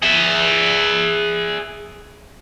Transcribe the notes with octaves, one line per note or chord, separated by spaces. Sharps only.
G#4 E5